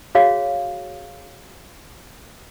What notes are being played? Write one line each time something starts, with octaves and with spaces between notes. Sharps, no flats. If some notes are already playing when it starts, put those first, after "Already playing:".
F#4 G#4 C#5 F5